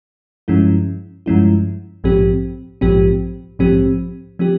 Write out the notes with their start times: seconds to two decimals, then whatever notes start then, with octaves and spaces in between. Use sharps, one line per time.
0.48 G2 F3 G#3 C#4 E4
1.26 G2 F3 G#3 C#4 E4
2.04 A#1 G#2 F3 C4 G4
2.81 A#1 G#2 F3 C4 G4
3.59 A#1 G#2 F3 C4 G4
4.39 F3 C4 G4